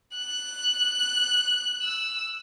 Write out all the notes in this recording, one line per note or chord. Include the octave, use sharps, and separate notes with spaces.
F#6
E6